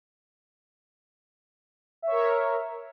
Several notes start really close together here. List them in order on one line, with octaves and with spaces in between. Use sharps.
E5 C#5 A#4